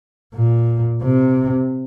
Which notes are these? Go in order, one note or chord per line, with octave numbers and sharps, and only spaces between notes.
A#2
C3